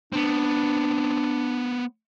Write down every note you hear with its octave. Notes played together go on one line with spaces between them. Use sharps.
B3 C4 D4